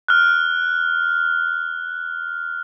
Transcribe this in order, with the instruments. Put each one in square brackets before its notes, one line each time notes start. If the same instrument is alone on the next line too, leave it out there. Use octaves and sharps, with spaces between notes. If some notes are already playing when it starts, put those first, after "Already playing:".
[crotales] F6 F#6